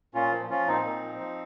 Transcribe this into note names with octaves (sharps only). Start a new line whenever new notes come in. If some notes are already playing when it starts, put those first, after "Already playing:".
A#2 C#4 F4
F3
F3 C#4 F4
A#2 C4 D#4
A#2
F3
F3